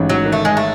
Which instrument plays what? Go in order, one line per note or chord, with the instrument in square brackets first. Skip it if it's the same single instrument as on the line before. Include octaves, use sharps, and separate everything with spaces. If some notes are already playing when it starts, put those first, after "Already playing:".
Already playing: [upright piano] A1 G#2
[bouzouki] F#3
[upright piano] D#3
[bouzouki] A3
G#3
A3